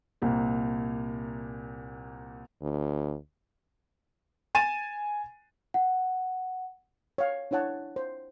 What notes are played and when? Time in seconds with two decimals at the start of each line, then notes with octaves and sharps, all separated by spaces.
0.22 C2 A#2 A#3
2.62 D2
4.55 G#5 A6 D#7 E7
5.74 F#5
7.18 C#5 F5
7.51 D4 E4 C#5 F#5 A5
7.96 C5